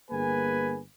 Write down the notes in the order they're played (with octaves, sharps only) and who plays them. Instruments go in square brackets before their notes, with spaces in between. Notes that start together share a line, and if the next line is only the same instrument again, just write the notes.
[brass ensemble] G1 A#3 G#4 B4 G#5